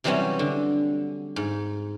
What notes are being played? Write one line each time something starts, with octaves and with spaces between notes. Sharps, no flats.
C3 E3 F#3 G3 C4 C#4
D3
G#2